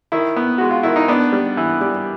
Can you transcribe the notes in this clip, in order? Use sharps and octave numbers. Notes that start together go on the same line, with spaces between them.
D#3 E4
B3
G#3 F#4
F4
D#3 E4
D#4
B3 D4
G3
E3
G3